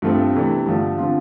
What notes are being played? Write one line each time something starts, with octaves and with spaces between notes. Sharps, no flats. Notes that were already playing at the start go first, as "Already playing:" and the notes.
G2 F3 A3 C4
C3 E3 A3 D4
G2 D3 F3 A3
D3 F3 C4 F4